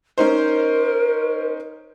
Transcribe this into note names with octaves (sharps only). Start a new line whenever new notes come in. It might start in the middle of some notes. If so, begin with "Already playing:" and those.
C#4 D#4 A#4 C5